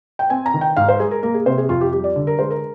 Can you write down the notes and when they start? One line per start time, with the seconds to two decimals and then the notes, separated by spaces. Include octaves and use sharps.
0.19 G5
0.30 C4 G#5
0.46 A#5
0.54 D#3
0.61 G5
0.76 G#2 F5
0.89 C5
1.00 G#3 G#4
1.11 A#4
1.23 A#3 A#4
1.34 G#4
1.46 C3 C5
1.58 G#4
1.69 F2 F4
1.81 G4
1.92 G3 G4
2.04 D5
2.16 D3
2.27 A#4
2.39 G#3 C5
2.50 A#4